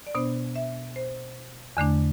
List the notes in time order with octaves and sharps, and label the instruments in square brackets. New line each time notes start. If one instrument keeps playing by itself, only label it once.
[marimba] D5
B2 B3 D4 C5
E5
C5
E2 D3 A3 D4